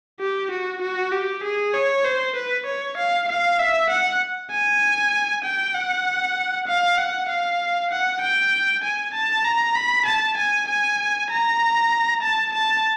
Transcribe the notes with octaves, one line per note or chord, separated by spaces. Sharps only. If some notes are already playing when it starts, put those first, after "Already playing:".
G4
F#4
F#4
G4
G#4
C#5
C5
B4
C#5
F5
F5
E5
F#5
G#5
G5
F#5
F5
F#5
F5
F#5
G5
G#5
A5
A#5
B5
A5
G#5
G#5
A#5
A5
A5